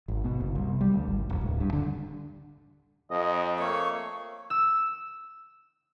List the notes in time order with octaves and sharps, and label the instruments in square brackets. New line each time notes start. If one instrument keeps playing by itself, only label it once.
[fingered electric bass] G#1
B2
F#1
C2
G3
D2
G#1
E1
D1
G2
D3
[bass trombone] F2 [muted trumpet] D#5
[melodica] A3 A#3 C#5 [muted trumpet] C#6
[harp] E6